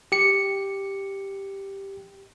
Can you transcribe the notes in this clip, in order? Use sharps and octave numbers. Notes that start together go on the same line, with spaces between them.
G4 C#7